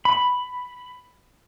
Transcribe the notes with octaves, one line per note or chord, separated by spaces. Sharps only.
B5